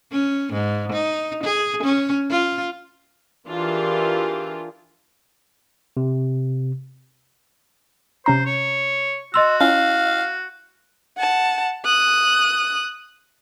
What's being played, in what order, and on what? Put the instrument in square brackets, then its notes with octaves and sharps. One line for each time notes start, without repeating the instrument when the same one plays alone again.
[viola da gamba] C#4
G#2
D#4
G#4
C#4
F4
[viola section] E3 D4 F4 G4 G#4 A#4
[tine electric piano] C3
[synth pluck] C3 C#4 A#5 [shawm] C5
[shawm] C#5
[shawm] F#4 [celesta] D#5 C6 E6 [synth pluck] E7
[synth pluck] C#4 [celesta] E4 [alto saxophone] F5
[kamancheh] F#5 A5
D#6 F#6